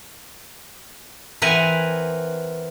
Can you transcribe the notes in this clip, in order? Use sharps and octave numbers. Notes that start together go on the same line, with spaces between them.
E3 C4 A#4 B4 F#5 G#5